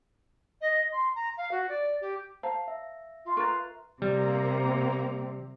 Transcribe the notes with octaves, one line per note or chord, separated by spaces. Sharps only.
D#5
C6
A#5
F5
F#4
D5
G4
C5 F5 A5 A#5
E5
F4
A#4 B4 A#5 C#6 A6
C3 G3 A#3 A#5